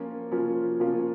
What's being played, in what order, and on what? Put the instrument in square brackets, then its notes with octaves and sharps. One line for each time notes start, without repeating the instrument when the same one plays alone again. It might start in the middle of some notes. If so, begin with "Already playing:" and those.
Already playing: [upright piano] F3 A#3 C#4 F4
F3 A#3 C#4 F4
F3 A#3 C#4 F4